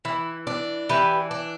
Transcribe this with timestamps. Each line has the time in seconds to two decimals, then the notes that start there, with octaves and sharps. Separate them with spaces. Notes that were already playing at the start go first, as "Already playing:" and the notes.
0.05 E3 E4
0.47 D4
0.89 E3 G4 B4
1.31 D4